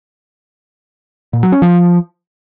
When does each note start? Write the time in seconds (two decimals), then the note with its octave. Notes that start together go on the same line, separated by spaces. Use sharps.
1.33 A#2
1.43 F#3
1.52 C#4
1.62 F3